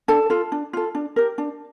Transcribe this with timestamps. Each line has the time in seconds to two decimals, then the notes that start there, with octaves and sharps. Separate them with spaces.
0.08 D4 A4 A5
0.30 F4 A4
0.52 D4
0.73 F4 A4
0.95 D4
1.16 G4 A#4
1.38 D4